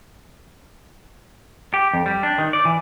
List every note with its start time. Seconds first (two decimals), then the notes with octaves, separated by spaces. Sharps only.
1.74 G4
1.93 F2
2.06 G3
2.23 D4
2.38 D#3
2.53 D5
2.65 E3